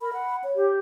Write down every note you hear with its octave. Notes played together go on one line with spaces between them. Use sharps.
A#4 B5
F#5
C#5
G4